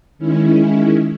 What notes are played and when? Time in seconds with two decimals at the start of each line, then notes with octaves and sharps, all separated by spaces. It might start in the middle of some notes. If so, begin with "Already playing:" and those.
0.18 D#3 G#3 C#4 E4